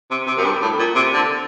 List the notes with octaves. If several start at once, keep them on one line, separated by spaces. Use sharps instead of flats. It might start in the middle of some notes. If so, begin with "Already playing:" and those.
C3
C3
F#2
G2
A2
A#2
C3
D3